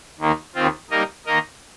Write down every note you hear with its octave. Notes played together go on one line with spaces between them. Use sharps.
D#2 D#3 A#3
D#2 D#3 C4 F4
G3 A#3 D#4 A#4 D#5
D#3 A#3 D#4 A#4 D#5